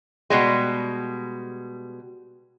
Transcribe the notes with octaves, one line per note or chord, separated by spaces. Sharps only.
B2 G3 G#3